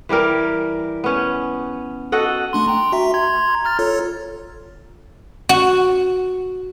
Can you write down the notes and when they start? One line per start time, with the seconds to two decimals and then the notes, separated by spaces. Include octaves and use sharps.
0.09 E3 G3 G4 A#4
1.04 B3 C#4
2.12 F#4 A4 D#5 F#5
2.53 A3 D4 C6
2.66 G5 A#5 C6
2.92 F#4 E5
3.14 A#5 C6 G#6
3.65 A#5 F6 A6
3.79 F4 A4 C#5
5.49 F#4